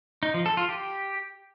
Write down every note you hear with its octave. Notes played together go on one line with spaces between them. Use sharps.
D#4
F3
A4
F4
G4